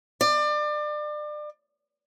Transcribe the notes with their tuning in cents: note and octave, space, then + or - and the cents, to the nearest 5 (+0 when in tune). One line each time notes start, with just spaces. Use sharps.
D5 +30